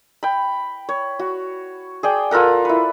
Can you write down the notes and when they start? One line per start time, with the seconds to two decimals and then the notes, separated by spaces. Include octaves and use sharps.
0.23 G5 B5
0.89 C#5
1.19 F#4
2.03 G#4 D5 G5
2.31 F4 A4 A#4 F#5
2.65 E4 B4